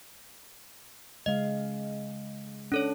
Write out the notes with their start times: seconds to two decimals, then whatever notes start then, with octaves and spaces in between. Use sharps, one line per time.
1.26 C#3 G#3 D#5 F5
2.72 C#4 D4 A4 C#5